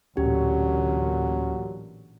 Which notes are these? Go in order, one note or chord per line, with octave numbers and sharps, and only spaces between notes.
A1 D2 A#2 D3 F#3 C#4 G4